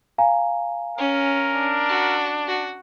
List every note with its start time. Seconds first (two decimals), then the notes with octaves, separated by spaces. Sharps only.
0.18 F5 G#5 A#5
0.98 C#4 A#4
1.54 D4
1.88 F#4
2.47 F#4